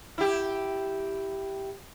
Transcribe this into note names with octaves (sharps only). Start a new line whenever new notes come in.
E4 G4